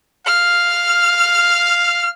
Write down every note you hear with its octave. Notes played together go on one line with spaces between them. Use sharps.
F5 F6